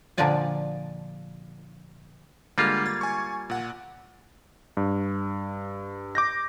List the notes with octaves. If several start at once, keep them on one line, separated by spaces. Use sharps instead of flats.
A#2 D3 F3 D4 D5 G#5
D3 G3 G#3 A#3 F4
G#6 A6
G#5 C#6
A#2 F#5
G2
D6 G6 A#6